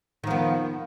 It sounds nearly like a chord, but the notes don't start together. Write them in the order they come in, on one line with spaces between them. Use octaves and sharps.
D#3 F3 B3